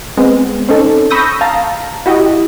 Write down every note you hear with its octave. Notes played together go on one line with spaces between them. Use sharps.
G#3 B3 C4
C4 C#4 D#4 A4
B5 C#6 D#6 E6 G6 A#6
F5 A5 A#5
E4 F#4 G4 D#5